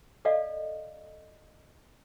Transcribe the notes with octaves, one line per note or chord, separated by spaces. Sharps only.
A4 D5 D#5 F5